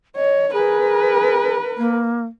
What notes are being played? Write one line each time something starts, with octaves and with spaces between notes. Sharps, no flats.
C#5 D#5
G#4 A#4 B4
A#3